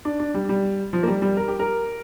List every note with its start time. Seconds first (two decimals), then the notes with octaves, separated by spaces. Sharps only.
0.05 D4
0.20 D4
0.34 G3
0.49 G3
0.93 F3
1.03 A#3
1.08 G3
1.22 G3
1.37 A#4
1.48 G4
1.59 A#4